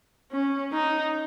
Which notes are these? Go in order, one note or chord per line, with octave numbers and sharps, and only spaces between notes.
C#4
D#4